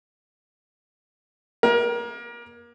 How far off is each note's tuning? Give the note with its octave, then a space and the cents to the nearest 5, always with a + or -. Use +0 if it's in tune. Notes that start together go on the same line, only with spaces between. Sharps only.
A#3 +30 A#4 +30